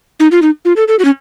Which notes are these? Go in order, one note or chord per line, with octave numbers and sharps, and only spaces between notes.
D#4
F4
D#4
F4
A4
A4
F#4
C#4